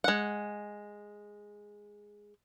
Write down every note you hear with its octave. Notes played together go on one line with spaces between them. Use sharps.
G#3 F#5